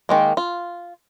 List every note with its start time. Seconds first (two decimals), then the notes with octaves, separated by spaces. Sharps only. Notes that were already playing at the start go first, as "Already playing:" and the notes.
0.09 D#3 G#3 A#3
0.37 F4